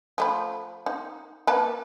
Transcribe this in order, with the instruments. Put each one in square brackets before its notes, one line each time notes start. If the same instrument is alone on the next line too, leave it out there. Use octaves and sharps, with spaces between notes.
[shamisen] F3 A3 B5
D#4
A#3 B4 A5